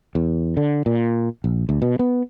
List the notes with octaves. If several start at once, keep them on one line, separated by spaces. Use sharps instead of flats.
E2
D3
A#2
A#1
D2
B2
B3